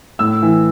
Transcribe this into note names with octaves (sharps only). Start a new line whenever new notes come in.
A2 E6
E3